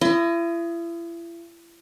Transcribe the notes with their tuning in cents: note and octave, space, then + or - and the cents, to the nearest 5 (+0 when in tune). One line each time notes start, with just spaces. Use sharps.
E4 +40 D#5 +0